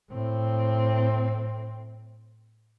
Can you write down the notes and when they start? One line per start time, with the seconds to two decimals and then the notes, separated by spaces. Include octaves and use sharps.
0.11 A2 C4